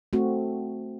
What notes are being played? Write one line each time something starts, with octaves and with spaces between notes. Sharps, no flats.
A3 C4 F#4